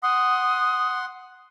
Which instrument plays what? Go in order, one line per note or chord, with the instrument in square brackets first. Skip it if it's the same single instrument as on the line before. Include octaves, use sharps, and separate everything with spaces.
[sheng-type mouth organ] F#5 C6 [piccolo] D#6